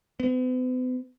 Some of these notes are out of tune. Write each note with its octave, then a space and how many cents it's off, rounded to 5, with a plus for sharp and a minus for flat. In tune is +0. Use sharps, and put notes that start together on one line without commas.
B3 +45